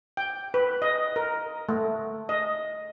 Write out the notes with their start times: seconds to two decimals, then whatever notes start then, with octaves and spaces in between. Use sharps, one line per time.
0.17 G5
0.54 B4
0.82 D#5
1.16 A#4
1.69 A3
2.29 D#5